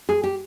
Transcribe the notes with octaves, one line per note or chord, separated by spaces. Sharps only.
G#4
G4